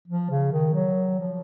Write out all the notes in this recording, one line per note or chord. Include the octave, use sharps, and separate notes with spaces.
F3
C#3
D#3
F#3
F3